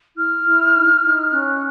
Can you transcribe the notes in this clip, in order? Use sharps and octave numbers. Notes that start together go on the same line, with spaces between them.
E4 F6
E4
D#4
D#4
C#4 F#6